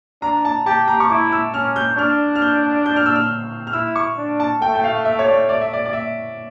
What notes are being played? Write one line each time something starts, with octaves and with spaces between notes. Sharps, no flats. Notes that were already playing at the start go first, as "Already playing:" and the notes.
D4 A#5
A5
G4 A5
A#5
C#6
E4 D6
E6
C#4 F6
G6
D4 F6
F6
G6
G6
F6
E6
F6
F6
E4 E6
C#6
D4
A5
A3 G5
G5
F5
E5
C#5
D5
D5
E5
D5
D5
E5